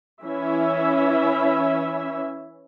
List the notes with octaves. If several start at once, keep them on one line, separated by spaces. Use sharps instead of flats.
E3 C#4 E4 E5